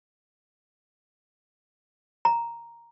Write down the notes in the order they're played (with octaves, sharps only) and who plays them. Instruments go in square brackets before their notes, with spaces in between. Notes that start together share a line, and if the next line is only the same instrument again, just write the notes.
[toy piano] A#5